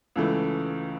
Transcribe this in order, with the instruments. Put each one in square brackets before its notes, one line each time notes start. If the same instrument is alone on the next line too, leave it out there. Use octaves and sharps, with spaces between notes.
[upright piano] C#2 C#3 E3 A3